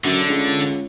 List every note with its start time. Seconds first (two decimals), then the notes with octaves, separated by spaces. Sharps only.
0.04 F#2 D3
0.29 C#2